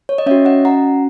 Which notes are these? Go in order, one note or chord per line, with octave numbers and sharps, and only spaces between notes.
C#5
D#5
C#4 F#4 C#5 E5
D#5 F#5
F#5 A#5